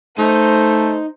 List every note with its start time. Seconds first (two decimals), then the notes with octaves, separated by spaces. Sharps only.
0.18 A3 D#4 C5